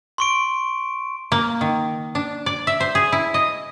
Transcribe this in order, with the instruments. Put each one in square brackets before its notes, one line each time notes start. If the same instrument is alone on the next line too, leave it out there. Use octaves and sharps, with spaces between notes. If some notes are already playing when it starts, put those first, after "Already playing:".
[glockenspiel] C6 C#6 D7
[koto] A#3
D#3
D4
D5
E5
C5
G#4
E4
D#5